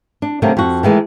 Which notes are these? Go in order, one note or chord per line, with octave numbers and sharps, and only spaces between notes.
D4
C3 D#3 F#3 A3 A#3 D4
F2 F#4
D#3 E3 G#3 A3